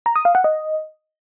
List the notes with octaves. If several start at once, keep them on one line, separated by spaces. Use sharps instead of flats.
A#5
D#6
F5
F#5
D#5